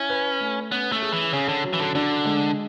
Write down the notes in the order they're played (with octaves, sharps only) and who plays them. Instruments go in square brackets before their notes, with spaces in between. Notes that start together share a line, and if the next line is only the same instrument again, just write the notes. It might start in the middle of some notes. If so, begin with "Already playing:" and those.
Already playing: [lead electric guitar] C#4 [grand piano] E4
[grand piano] B4
A3
[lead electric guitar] B3 [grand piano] C#4
[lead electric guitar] A3
[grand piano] G#4
[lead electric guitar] E3
[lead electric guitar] C#3 [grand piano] C#4
[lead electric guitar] D3
[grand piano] F#3
[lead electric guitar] E3
D3
[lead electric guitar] D3 [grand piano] D4
[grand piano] G#3